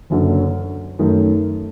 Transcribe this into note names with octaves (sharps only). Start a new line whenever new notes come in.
F#1 F#2 D3
F#2 D#3 A3